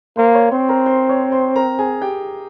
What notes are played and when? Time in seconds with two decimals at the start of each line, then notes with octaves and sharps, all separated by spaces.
0.17 A#3 C5 C6
0.34 C#5 C#6
0.51 C4 C5 C6
0.69 A#4 A#5
0.86 C5 C6
1.09 C#5 C#6
1.32 C5 C6
1.56 A#4 A#5
1.79 G#4 G#5
2.01 G4 G5